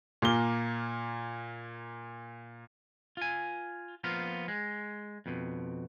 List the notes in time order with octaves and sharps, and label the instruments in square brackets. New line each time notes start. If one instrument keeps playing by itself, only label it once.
[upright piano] A#2 A#3 G7
[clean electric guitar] F4 G#5
F3 A#3 B3 F4
G#3
F2 B2